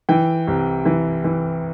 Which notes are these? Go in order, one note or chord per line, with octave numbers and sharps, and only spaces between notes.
E3 G5
C2
E3
E3